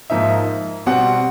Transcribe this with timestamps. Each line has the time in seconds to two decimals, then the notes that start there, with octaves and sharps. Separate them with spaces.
0.10 G#2 F3 A#3 D#4 E5
0.86 B2 G3 C4 F#5